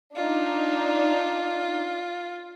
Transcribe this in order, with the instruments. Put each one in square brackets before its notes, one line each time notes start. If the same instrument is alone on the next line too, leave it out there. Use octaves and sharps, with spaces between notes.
[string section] D4 D#4 [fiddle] F4